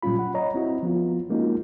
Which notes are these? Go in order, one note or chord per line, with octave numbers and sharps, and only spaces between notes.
A#2 F#3 G3 C#4 F4 B5
F#5
C#5 D#5 A#5
C4 E4 F#4
F3 B3 F4
G#3 A#3 C#4 D#4 F4 F#4